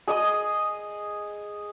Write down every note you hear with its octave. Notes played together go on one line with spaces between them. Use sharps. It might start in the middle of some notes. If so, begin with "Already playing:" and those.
G#4 D#5 D#6